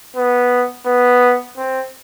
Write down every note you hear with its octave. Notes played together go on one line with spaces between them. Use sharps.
B3
B3
C4